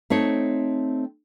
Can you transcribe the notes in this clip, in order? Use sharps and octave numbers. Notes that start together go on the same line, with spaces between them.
A3 C4 D#4 C#5